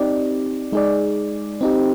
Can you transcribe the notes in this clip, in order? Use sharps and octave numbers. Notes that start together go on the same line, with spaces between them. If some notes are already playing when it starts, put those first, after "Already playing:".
Already playing: C4 D#4 G4 D5
G#3 D#4 G#4 D5
C4 D#4 G4